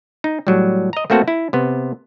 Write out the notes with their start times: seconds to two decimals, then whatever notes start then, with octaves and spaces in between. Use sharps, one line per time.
0.24 D#4
0.47 A2 F#3 G3
0.93 D#5 A#5
1.10 A3 A#3 C4 F#4 A4 B4
1.28 E4
1.53 C3 B3